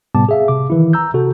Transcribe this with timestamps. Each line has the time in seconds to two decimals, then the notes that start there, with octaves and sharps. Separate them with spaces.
0.15 A2 C3 G3 B3 A5 D6
0.29 G#4 E5 F5
0.48 C3 D6
0.70 D#3 E3 E4
0.93 A#5 E6 G6
1.14 C3 F#4 A4